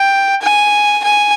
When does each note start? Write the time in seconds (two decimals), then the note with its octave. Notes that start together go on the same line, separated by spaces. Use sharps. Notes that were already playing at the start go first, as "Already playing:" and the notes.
Already playing: G5
0.41 G#5
1.04 G#5